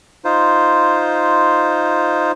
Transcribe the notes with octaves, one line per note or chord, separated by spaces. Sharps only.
D#4 F4 C5